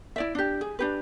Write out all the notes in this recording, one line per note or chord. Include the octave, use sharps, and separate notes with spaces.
E4 D5 E5
D4 G4
G#4
D4 G4 B4